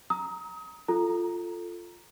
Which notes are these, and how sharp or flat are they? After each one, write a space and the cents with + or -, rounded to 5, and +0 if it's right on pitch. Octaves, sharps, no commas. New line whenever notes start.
A#5 +0 D#6 +35
F4 +0 A4 +0 A#5 +0